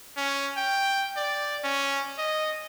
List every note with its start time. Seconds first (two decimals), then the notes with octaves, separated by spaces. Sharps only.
0.17 C#4
0.57 G5
1.17 D5
1.64 C#4
2.18 D#5